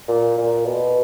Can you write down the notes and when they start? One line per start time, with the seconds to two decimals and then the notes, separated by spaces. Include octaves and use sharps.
0.08 A#2
0.38 A#2
0.66 B2